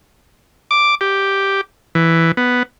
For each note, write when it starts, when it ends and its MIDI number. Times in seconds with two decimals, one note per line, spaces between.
0.71 0.95 86
1.01 1.61 67
1.95 2.32 52
2.37 2.63 59